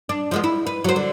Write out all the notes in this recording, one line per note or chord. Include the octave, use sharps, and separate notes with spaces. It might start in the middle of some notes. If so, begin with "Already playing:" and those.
D4
F3 G#3 B3
E4
B4
F#3 C5
D3